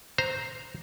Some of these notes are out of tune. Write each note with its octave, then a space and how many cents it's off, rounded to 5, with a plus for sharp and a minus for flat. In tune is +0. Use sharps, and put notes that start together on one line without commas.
C5 +0 A#5 +0